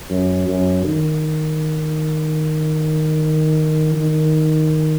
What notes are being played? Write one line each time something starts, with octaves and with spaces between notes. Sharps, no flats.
F#2
F#2
D#3
D#3